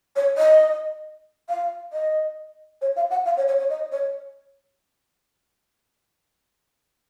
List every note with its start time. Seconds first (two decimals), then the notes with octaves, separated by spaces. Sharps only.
0.16 C#5
0.38 D#5
1.49 F5
1.93 D#5
2.82 C#5
2.96 F5
3.11 F#5
3.26 F5
3.37 C#5
3.48 C#5
3.59 C#5
3.70 D#5
3.92 C#5